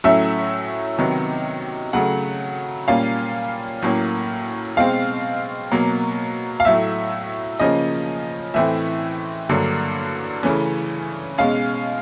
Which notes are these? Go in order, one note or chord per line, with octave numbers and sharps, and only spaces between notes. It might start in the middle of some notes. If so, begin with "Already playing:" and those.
A2 F#3 A3 C#4 E5
C3 D#3 F#3 B3
C#3 F#3 A3 F#5
A#2 G3 A#3 C#4 F5
A2 F#3 A#3 C#4
B2 G#3 C4 F5
B2 F#3 A#3
F5
A2 F#3 A3 E5
C#3 F3 A#3 C#4 D#5
A2 E3 A3 C4 E5
G2 D3 F#3 A#3
C#3 E3 A3 C#4
B2 G#3 C#4 F5